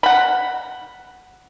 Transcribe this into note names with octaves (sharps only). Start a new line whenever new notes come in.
F#5 B5